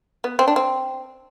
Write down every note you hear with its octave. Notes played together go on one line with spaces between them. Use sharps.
B3
C4
D4
C4